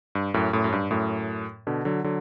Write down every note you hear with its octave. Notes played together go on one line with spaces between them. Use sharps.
G2
F#2 A2
F#2 A2
F#2
G2
F#2 A2
B2 D3
D3 F#3
D3 F#3